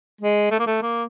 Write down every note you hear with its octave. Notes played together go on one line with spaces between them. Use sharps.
G#3
A3
A#3
A3
A#3